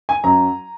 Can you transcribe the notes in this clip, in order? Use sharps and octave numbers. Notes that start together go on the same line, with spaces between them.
G#5
F#2 F#3 C#4 A#5